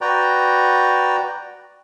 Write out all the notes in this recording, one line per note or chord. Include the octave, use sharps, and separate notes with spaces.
F#4 B4 D5 G5 A#5